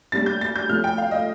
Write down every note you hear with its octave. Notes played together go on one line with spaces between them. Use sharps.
A2 G3 A#3 D4 A6
G6
A6
G6
A2 F3 A3 F6
G5
F5
D#5